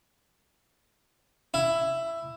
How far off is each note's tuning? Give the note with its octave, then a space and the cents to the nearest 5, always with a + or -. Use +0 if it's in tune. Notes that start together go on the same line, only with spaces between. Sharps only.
E4 +10